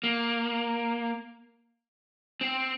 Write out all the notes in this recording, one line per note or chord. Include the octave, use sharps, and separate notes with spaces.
A#3
C4